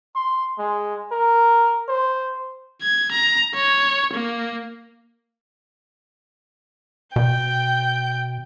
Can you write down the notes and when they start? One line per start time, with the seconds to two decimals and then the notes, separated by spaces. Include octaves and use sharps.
0.15 C6
0.58 G#3
1.12 A#4
1.88 C5
2.82 G#6
3.11 A#5
3.54 C#5
4.13 A#3
7.16 B2 G5 G6